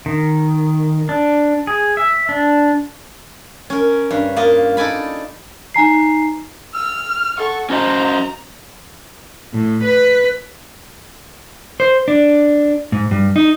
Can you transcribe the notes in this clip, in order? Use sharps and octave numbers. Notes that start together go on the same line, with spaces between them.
D#3
D4
G#4
E5
D4
C#4 A#4
G2
A#3 F4 D#5
D#4 A4 D5 G#5 B5
D#4 G#5 A#5 C7
E6 F6
A4 F#5 C#6
C#4 F#4 C5 D#5 A#5
A2
B4
C5
D4
G#2
G2
D#4